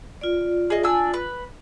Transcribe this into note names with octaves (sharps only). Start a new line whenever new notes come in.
F4 D5
G#4 D#5
D4 G#5 E6
B4